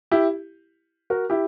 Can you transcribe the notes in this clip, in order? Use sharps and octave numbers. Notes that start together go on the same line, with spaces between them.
E4 G4
F#4 A#4
E4 G4